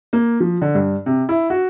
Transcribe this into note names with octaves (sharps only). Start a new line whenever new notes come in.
A#3
F3
D3
G2
C3
E4
F#4